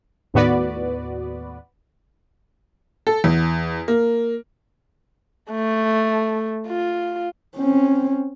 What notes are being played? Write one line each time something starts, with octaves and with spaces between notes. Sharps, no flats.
D#2 A2 B3 F#4 B4 D5
A4
E2
A#3
A3
F4
C4 C#4